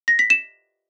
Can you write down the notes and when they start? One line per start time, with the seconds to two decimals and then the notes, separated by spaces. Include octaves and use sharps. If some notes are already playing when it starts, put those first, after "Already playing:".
0.08 A#6
0.19 B6
0.30 E7